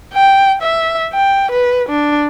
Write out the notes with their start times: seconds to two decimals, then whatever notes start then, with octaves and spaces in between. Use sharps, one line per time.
0.13 G5
0.62 E5
1.14 G5
1.51 B4
1.89 D4